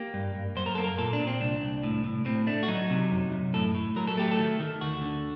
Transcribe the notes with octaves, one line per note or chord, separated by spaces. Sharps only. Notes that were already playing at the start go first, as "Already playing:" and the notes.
Already playing: A#3 G4
G2
G2
F#2 C5
A#4
A#3 A4
A#4
A#2 A4
D4
A#2
C4
C2 D4
C2
A2
A2
A2 C4
A3 D4
F#4
F#3 D#4
C3
F#2
F#2
A2 A4
A2
F#3 A#4
A4
A3 G4
A4
D#3
D#3
D2 F#4
D3